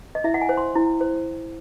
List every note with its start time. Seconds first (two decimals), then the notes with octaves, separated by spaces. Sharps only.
0.15 D#5
0.24 E4 E5
0.34 F#5
0.41 G#5
0.49 C5
0.57 C6
0.75 E4
1.01 C5